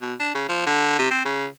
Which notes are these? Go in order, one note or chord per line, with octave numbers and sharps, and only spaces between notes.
B2
D4
C#3
F3
D3
C3
C4
C#3